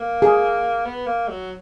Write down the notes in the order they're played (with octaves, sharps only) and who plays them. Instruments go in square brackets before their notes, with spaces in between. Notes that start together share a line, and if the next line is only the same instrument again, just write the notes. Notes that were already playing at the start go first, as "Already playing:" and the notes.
Already playing: [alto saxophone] A#3
[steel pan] G#4
[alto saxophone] B3
A#3
F#3